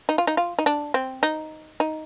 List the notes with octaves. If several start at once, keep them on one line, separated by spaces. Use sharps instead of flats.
D#4
F4
D#4
F4
D#4
D4
C4
D#4
D#4